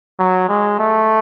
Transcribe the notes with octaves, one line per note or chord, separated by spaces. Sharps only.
F#3
G#3
A3